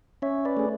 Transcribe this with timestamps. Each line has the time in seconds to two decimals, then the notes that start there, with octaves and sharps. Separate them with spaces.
0.22 C#4 C#5 E5
0.45 B4 D5
0.57 A3 G#4